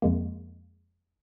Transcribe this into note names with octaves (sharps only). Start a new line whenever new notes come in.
F2 G#3 A#3